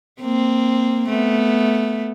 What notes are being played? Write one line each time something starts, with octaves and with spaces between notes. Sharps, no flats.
A#3 C4
A3 B3